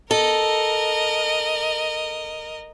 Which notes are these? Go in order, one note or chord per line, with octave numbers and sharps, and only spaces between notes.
A4 A#4 D#5